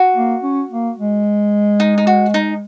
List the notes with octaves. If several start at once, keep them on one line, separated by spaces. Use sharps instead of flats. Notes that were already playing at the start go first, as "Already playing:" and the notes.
Already playing: F#4
A#3
C#4
A#3
G#3
D#4
D#4
F#4
D#4